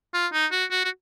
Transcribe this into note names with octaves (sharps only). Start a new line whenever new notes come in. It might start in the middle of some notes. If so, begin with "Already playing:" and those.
F4
D#4
F#4
F#4
F#4